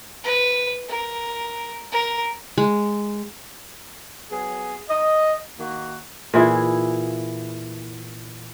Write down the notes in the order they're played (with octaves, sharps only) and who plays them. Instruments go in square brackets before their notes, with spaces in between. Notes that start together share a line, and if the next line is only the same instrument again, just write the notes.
[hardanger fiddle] B4
A#4
A#4
[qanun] G#3
[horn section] F#3 B3 F#4 G#4
D#5
D#3 A#3 F#4
[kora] A#2 E3 E4 G#4